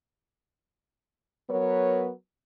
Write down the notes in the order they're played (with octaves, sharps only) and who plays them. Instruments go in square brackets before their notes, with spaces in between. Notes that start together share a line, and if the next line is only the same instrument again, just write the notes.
[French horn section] F#3 B3 A#4 B4 C#5